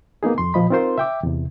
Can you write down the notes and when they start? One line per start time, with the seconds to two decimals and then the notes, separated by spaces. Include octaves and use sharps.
0.23 A#3 B3 D#4 G#4
0.38 F2 C6
0.54 A#2 F3 D#5 B5
0.70 C4 D#4 F4 A#4 C5 C6
0.98 E5 G5 D6
1.23 E2 C3